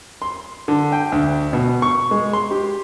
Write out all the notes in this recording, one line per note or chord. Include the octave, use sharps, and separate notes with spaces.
C6
D3
G5
D2
B2
C#6
G#3
C6
G4